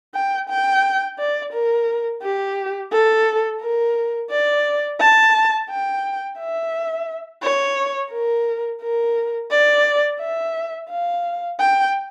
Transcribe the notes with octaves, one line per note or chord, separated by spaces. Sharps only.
G5
G5
D5
A#4
G4
A4
A#4
D5
A5
G5
E5
C#5
A#4
A#4
D5
E5
F5
G5